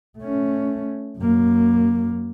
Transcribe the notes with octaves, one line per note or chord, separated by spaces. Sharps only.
A3 C#4
F#2 A#3